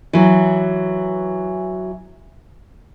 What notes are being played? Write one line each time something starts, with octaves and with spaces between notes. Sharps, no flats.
E3 F#3